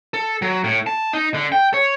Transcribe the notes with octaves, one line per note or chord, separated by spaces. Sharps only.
A4
F#3
A2
A5
D#4
D3
G5
C#5